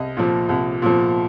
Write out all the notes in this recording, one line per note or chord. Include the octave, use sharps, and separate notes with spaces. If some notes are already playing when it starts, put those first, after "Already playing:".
Already playing: C2 D#5
A#2 F3
C2
A#2 F3